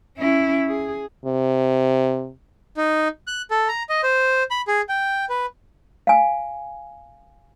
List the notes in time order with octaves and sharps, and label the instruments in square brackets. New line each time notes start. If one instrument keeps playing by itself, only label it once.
[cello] C#4 E4
G#4
[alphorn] C3
[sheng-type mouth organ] D#4
F#6
A4
A#5
D#5
C5
B5
G#4
G5
B4
[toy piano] F5 G#5